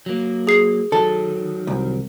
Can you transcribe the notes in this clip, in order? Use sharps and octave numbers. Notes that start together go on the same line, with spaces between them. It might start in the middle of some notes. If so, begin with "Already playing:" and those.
F#3 A#3
G#4 C7
D#3 F#3 A4
C2